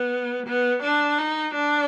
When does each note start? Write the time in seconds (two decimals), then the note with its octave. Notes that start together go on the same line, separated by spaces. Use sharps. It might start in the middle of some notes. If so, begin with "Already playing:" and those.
Already playing: B3
0.46 B3
0.83 D4
1.18 D#4
1.55 D4